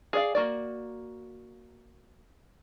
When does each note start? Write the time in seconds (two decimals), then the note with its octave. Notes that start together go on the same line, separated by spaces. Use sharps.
0.13 G#4 D5 F5
0.35 A#3 F#4 D5